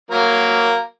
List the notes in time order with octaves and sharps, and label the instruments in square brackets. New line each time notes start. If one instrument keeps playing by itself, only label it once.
[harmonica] F#3 A#3 A#4